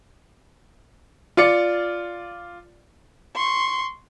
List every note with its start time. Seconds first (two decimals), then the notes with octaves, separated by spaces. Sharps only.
1.37 F4 D5 C#7
3.35 C6 C#6